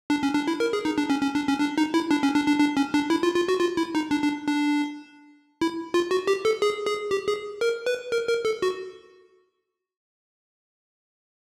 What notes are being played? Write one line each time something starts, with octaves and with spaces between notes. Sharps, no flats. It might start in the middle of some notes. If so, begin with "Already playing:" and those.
D4
C#4
D4
E4
A#4
G#4
D#4
D4
C#4
C#4
D4
C#4
D4
D#4
E4
D4
C#4
D4
D4
D4
C#4
D4
E4
F4
F4
F#4
F4
E4
D#4
D4
D4
D4
E4
F4
F#4
G4
A4
G#4
G#4
G4
G#4
A#4
B4
A#4
A#4
A4
F#4